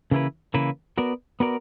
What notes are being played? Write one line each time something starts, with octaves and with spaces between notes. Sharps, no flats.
C#3 E3 A#3 E4 B4
C#3 E3 A#3 E4 B4
B3 F#4 A#4 D5
B3 F#4 A#4 D5